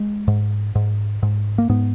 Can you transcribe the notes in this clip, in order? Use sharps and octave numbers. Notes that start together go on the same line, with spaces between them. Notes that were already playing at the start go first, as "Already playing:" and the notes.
Already playing: G#3
G#2
G#2
G#2
A#3
G#2 B3